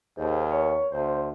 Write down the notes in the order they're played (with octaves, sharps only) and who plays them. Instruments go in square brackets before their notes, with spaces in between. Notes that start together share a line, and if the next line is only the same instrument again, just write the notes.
[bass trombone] D#2 [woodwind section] G#2
[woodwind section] B3 A#4 C#5
[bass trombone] D2 [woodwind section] C5